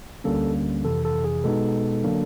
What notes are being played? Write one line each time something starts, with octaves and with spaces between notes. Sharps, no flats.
D2 D3 G3 A#3 C#4 A4
F2 C3 E3 A4
A4
G#4
B2 G#3 B3 D#4 A4
D3 F#3 A#3 D4